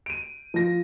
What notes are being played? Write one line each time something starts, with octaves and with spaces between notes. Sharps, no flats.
D7 D#7
F3 A#6